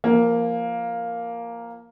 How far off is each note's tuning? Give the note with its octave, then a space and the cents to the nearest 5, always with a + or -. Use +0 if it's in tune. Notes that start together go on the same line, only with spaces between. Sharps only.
F3 -20 A#3 +0